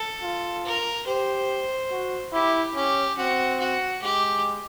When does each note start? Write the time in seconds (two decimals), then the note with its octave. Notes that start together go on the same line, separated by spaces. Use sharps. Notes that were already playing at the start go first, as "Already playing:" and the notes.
Already playing: A4
0.22 F4
0.65 A#4
1.07 G4 C5
1.91 F#4
2.33 E4 G4
2.75 C#4 G4
3.17 C4 F#4
3.59 F#4
4.02 G#3 G4